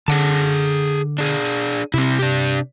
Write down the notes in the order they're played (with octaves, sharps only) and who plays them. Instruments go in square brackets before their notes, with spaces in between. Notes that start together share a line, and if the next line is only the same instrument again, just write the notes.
[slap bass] D3 [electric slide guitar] G#4 F#5 A5
[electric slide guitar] D4 G#4
[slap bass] C3 [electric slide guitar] C4 E4
[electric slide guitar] D4 G4